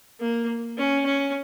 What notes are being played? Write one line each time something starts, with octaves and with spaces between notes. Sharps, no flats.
A#3
C#4
C#4